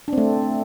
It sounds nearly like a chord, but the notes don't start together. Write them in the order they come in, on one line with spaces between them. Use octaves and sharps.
D4 C4 A3